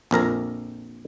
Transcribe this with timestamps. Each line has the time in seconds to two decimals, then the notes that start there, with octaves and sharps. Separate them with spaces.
0.11 A#1 F2 A#4 A#5